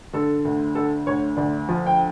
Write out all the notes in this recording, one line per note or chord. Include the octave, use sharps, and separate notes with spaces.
D3 A4
D2
D3 A4
D2 C#5
D2 D5
F3
G5